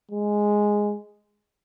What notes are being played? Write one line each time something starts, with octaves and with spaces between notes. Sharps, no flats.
G#3